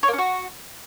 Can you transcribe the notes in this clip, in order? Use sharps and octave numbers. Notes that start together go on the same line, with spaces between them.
C#5
A#3
C#4
F#4